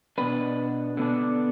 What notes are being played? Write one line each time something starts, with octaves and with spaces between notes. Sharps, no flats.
B2 B3 D4 B4
D3 B3 D4